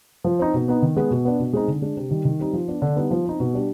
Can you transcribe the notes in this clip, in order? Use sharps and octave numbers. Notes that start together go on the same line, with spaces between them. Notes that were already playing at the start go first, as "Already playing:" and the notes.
F3
C4 D#4
B2
B3 D#4
D#3
G#3 B3
B2
B3 D4
B2
G#3 C4 D#4
D3
G#3 D4
C3
D#3 G3
D#3
G3 C4 D#4
F3
B3 D4
D3
G3 B3 D#4
F3
C4 D#4
B2
G3 D4